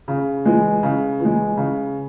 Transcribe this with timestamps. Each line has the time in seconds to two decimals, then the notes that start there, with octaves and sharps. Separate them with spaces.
0.08 C#3
0.45 E3 G#3
0.83 C#3
1.20 E3 G#3
1.57 C#3